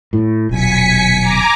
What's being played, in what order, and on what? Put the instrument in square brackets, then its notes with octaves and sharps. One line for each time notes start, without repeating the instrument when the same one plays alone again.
[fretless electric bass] A2
[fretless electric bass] D#1 B1 [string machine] G#5 B6 C#7
[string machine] G#5 A#5 D6